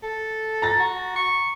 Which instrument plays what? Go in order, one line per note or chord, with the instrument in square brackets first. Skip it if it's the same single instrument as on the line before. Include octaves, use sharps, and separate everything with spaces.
[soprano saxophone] A4
[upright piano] A#5 A6
[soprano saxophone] F#4
C#6